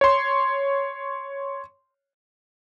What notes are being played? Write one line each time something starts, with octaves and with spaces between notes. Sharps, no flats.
C#5 C6